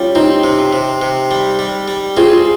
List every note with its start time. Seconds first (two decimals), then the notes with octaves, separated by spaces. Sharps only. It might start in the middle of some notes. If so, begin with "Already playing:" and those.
Already playing: G3 C#4 F4
0.15 C4 D#4 G4
0.44 C3
0.73 C3
1.02 C3
1.31 G3
1.59 G3
1.88 G3
2.17 C4 F4 G#4